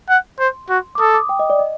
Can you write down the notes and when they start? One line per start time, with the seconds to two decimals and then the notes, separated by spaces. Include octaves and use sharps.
0.09 F#5
0.39 C5 C6
0.69 F#4
0.95 D6
0.99 A4 D#6
1.14 D6
1.29 G5
1.39 D#5
1.50 D5
1.59 D#5